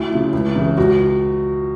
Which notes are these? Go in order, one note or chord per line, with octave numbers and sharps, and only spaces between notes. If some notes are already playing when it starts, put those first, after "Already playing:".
Already playing: D2 E4
C#3 F3
C#2
C#3 E3
C#2 F#4